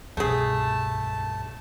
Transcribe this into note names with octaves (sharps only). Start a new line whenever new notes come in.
C2 G2 B2 A3 G#4 A5 G6